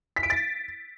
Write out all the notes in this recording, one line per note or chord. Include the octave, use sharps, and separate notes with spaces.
B6
D7
A6